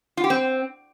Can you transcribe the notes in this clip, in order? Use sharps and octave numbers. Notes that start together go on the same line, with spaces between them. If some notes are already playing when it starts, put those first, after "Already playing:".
F4
G4
C4